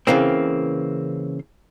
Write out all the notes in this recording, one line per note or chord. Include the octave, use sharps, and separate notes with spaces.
C#3 E3 A#3 C4